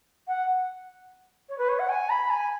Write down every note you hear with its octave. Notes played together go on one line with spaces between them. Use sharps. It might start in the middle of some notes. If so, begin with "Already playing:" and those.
F#5
C#5
B4
C#5
F#5
G#5
B5
G#5